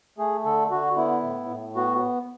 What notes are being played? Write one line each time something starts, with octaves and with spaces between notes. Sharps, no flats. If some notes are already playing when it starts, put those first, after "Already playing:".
A3 G#4
D3 A4
D3 F#4
B3 E4
A2
A2
B3 F#4